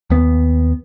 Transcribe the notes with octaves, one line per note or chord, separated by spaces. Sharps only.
D#2 B3